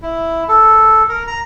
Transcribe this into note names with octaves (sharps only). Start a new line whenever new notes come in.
E4
A4
A#4
A#5